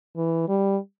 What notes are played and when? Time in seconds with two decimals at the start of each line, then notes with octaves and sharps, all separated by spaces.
0.17 E3
0.48 G3